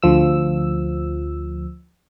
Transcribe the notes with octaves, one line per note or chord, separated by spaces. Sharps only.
D2 F3 E6